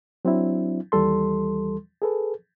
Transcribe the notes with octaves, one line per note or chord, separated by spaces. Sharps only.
F#3 C4 D4 E4
D#2 E3 G3 A4 C6
G#4 A4 B4